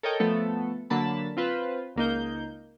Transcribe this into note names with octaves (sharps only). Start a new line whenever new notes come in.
A4 A#4 C#5 D#5 G5
F3 A3 B3 A4
D3 F#3 A#3 A5 B5
C4 F4 B4 C5
C#2 A#3 D#4 G6